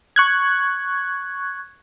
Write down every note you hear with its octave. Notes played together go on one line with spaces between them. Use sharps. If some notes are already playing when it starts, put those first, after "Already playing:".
C#6 F#6 G#6